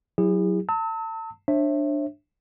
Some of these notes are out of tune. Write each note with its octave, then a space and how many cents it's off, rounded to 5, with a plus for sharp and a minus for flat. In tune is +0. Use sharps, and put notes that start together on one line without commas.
F#3 +0 E4 +5 G#4 -40
A5 +35 E6 -40
D4 +10 C#5 -45 E5 +0